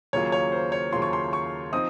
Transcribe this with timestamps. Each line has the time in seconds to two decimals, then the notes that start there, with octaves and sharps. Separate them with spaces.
0.13 D#2 C#3 F#3 A#3 F4 C#5
0.32 C#5
0.52 C5
0.72 C#5
0.92 D#2 C#3 F#3 A#3 F4 C6
1.02 C#6
1.13 C6
1.33 C#6
1.72 F3 C4 D#4 D#6